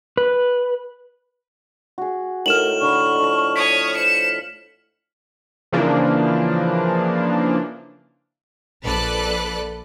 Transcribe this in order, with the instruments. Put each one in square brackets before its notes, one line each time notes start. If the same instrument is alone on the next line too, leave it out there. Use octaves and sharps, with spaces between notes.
[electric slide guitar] B4
[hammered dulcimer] F#4 G#4
[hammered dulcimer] A2 D#4 [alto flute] A#4 [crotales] F6 E7 F#7
[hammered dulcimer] D3 B5 [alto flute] C#6
[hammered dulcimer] F3 D#5
[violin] C#5 D#6 [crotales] B6
[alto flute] C5 [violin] C#7 E7
[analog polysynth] C#3 E3 F3 A#3 D4
[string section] A#1 A4 B4 D5 F#6